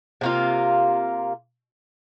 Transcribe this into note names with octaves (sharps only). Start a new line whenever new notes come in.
C3 A#3 F4